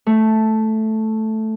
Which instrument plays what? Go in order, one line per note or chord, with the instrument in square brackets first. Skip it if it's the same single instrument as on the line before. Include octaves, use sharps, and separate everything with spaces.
[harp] A3